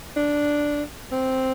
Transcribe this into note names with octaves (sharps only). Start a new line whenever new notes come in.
D4
C4